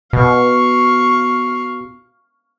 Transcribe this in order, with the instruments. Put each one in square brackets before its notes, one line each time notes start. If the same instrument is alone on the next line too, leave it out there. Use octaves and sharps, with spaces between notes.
[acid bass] B2 [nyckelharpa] F5 C#6